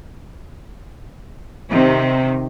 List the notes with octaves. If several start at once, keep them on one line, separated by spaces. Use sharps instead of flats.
C3 D#3